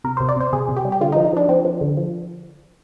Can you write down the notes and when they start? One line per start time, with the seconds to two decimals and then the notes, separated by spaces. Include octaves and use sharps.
0.04 C3 A#4
0.17 C3 C5
0.29 D5
0.36 C3 C5
0.53 C3 G#4
0.69 C3
0.76 G4
0.85 G3
0.92 G4
1.01 D3 F4
1.12 D#4
1.16 F3
1.25 D#4
1.33 F3 D4
1.49 F3 C4
1.65 F3
1.81 D3
1.97 F3